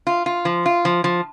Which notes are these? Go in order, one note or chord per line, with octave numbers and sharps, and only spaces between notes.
F4
F4
F3
F4
F3
F3